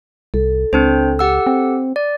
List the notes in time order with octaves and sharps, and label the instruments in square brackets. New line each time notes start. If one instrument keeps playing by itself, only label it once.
[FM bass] C2 [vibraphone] A4
[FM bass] C#2 [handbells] C4 D4 C5
[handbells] G4 F#5 E6
[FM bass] C4
[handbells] D5